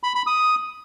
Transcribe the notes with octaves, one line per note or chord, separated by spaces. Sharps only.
B5
B5
D#6